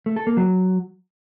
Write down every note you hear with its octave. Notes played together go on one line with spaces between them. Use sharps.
A3
A4
A#3
F#3